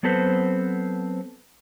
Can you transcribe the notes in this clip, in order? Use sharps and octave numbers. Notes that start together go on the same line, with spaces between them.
F#3 B3 C4 A4 B4 C5